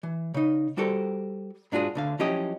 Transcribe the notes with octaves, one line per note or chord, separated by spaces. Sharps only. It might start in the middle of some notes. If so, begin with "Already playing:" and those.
E3
C#3 D#4
G3 F#4 G4 A4 A#4 C5
G#2 D4 F4 F#4 G#4
D2 D3 F5
F3 F#3 C#4 E4 G4 D#5